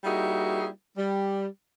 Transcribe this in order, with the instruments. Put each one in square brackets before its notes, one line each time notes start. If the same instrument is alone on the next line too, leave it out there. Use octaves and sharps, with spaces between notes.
[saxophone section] G3 A#3 D#4 E4 F#4 G#4
G3